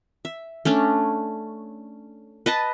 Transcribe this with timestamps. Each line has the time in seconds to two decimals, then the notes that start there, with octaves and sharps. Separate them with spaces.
0.25 E5
0.65 A3 C#4 D4
2.46 B4 D#5 A5